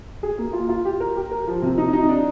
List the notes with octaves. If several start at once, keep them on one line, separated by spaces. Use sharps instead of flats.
G#4
A#3
F4
F4
G4
A#4
G4
A#4
F3
C3
D#4
D#4
D4